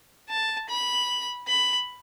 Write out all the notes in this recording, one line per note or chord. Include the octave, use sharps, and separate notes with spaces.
A5
B5
B5